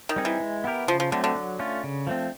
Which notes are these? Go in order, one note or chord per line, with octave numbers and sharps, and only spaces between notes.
D#3
G3 C4 D#4 G#4
E3
G#3
B3 E4 G4 A#4
C#3 F3
F3
D3 F#3 A3 C4
D3
F#3
A3 C#4 F4
C#3
F3 A3 C4